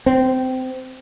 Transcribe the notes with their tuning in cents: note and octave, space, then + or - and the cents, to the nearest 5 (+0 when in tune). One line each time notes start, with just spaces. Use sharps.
C4 -20